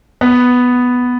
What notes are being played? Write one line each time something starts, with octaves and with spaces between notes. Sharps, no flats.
B3